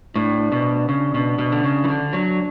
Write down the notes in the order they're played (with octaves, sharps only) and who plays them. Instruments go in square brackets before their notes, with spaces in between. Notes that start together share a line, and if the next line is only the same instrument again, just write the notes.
[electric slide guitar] A2 [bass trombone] D4
[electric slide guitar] B2
[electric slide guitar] C#3 [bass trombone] D4
[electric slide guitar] B2
B2
D3
C#3
E3
D3
F#3